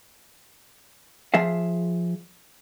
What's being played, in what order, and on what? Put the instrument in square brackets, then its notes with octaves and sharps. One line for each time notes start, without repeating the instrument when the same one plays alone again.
[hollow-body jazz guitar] F3 G#4 E5 F5